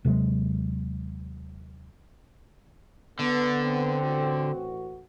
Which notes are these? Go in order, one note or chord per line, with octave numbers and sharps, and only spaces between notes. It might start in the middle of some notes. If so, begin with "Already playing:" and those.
D#2 C3 F#3 G#3
D3 B3
C4
A1 F#4